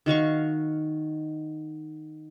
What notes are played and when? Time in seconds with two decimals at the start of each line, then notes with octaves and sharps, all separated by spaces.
0.06 D#3 F#4 F5 C#6